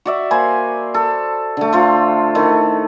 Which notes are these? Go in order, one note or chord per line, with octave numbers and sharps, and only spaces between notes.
F#4 D5 E5
A#3 C5 G#5 B5
A4
D3 A3
A3 F4 C5
D#3 A3 E4